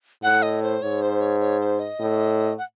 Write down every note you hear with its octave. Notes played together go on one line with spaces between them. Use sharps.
A2 F#5
D#5
C5
G#2 C#5
C5
C#5
C#5
C5
D#5
A2
F#5